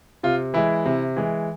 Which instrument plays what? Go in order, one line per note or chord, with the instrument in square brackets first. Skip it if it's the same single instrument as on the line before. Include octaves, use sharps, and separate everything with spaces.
[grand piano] C3 F4
E3 G#3 E4
C3
E3 G#3